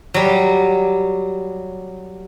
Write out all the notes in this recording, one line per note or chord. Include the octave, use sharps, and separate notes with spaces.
F#3 G3